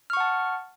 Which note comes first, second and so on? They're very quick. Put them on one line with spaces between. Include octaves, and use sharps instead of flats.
F6 C#6 F#5 A5